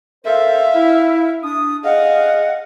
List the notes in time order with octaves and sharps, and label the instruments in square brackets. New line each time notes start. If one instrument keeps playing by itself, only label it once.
[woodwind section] A4 A#4 C5 [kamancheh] E5 F5
[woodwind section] E4
D4 D#6
[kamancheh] G#4 F5 [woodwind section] D#5 F#5